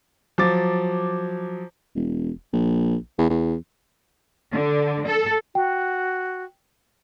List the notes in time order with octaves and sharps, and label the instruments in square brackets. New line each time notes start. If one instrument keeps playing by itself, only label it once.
[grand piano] F3 F#3 D6 A6
[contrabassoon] E1
A#1
E2
E2
[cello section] D3
A4
[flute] F#4 [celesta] G5